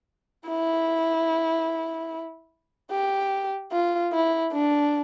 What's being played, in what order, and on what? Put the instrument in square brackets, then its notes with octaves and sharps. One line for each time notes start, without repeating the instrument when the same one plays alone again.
[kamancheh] E4
G4
F4
E4
D4